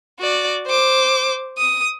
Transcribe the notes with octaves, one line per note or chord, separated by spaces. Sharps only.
F#4 D5
C5 D6
D#6